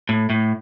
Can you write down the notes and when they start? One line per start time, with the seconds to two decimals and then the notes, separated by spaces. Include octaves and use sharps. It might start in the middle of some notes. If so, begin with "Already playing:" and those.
0.09 A2
0.30 A2